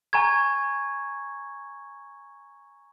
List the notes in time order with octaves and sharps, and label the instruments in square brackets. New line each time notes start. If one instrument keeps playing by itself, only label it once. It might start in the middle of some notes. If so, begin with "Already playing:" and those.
[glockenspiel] G#5 A#5 C#6 G#6